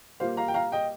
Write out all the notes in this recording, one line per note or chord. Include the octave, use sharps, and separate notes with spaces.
A#2 G3 A#3 C5 F5
F5 A#5
G5
F5 A#5
D#5 G5